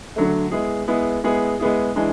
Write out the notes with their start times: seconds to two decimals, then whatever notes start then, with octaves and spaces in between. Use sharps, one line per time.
0.16 D3 F#3 A3
0.51 G#3 B3 E4 G#4
0.88 G#3 B3 E4 G#4
1.24 G#3 B3 E4 G#4
1.60 G#3 B3 E4 G#4
1.96 E3 G#3 D4